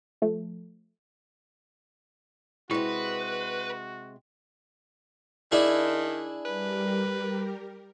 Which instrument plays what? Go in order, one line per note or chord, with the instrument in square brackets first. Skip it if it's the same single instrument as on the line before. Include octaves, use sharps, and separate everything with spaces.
[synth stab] F3 A3
[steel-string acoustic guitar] C3 G#3 [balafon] E4 [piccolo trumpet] F#4 [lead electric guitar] B4
[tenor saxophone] D#3 [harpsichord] D4 E4 G#4
[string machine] G3 G4 A#4 [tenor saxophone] B4